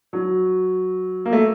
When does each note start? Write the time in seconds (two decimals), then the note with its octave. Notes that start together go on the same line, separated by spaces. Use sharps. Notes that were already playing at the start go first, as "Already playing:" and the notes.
0.13 F#3
1.26 A#3
1.33 A3